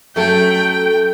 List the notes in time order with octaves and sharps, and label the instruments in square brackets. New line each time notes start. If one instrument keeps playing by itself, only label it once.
[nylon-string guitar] F#3 C#4 A4 [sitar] A3 [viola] G5